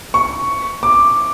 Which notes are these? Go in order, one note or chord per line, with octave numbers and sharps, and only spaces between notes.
C#6
D6